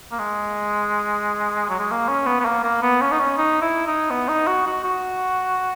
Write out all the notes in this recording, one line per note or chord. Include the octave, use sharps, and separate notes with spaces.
A#3
G#3
F#3
G#3
A#3
C#4
B3
B3
A#3
A#3
B3
C#4
D#4
C#4
D#4
E4
D#4
B3
D#4
F#4
F#4
F#4